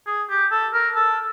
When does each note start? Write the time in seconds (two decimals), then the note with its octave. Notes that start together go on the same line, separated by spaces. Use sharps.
0.07 G#4
0.29 G4
0.51 A4
0.73 A#4
0.96 A4